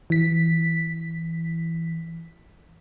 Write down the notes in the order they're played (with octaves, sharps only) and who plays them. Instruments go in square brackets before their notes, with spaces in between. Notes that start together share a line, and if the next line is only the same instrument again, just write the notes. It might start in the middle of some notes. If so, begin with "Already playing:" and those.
[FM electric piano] E3 B6